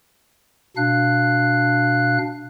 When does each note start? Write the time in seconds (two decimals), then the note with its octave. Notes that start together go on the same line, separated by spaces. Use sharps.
0.77 B2 D4 F5 F#6